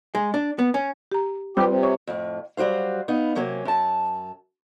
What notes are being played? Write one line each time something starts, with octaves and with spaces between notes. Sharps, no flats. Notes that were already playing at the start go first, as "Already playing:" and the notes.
G#3
D4
B3
C#4
G4 A#5
G3 C4 F4 G4 B4
C3
C#5
F2 A2
F#3 G3 F#4 C5 F5
B3 D#4 F5
C3 F#3 A#3 C#4
F#2 A5